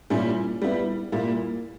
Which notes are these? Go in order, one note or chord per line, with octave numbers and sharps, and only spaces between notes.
A#2 G3 C#4 E4
G3 B3 E4
A#2 G3 A#3 E4